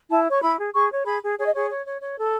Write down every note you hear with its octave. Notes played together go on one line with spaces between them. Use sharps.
E4 A5
C#5 C#6
E4 B5
G#4
G#4 C#6
C#5
G#4 B5
G#4
G#4 C#5
D#5
G#4 C#5
C#5
C#5
C#5
A4